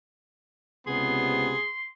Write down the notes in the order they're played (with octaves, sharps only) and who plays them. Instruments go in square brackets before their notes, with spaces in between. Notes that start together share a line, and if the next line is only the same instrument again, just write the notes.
[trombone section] C#2 C3 [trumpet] B3 [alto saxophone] G#4 [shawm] C6